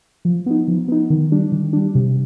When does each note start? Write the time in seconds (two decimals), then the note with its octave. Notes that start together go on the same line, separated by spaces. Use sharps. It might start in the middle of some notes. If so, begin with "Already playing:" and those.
0.25 F3
0.46 B3 D#4
0.68 F3
0.88 B3 D#4
1.10 D#3
1.32 G3 D4
1.52 D#3
1.73 G3 D4
1.95 C3